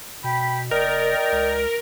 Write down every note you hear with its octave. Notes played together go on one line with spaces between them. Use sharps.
B2 G5 B5
F#1 A#4 D5 D#5 G5
C#2